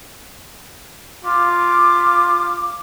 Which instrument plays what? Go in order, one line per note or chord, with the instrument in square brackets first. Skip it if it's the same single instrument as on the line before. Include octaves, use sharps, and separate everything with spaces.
[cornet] F4 [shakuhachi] D6